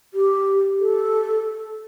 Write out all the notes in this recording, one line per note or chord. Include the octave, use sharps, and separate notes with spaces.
G4
A4